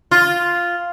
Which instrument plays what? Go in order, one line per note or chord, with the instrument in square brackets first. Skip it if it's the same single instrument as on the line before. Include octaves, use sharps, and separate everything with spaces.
[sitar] F4